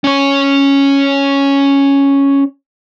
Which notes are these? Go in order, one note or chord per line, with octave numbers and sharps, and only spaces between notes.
C#4 C#5